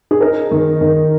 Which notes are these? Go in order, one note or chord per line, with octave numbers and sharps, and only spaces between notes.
G#4
D#4 A#4
D#3
D#3